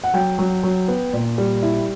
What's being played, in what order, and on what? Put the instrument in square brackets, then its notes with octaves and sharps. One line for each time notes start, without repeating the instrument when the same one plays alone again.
[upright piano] F#5
F#3 G5
F#3
F#3
B3
A#2
G3
E4